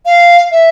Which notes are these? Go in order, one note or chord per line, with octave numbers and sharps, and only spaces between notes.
F5
E5